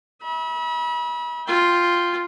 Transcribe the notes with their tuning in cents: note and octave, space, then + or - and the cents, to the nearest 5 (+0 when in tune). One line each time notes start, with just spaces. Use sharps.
E5 -40 B5 -35
F4 +0 G5 +0